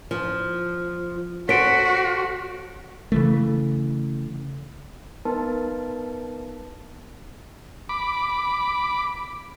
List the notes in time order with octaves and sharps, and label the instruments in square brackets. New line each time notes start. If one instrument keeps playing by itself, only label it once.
[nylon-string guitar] F3
[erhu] F#4 [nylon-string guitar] A4 C5 C#5 [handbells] B6 D7
[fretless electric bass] C#3 E3 A3
[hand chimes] B3 D#4 A#4 B4 A5
[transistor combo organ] B5 D6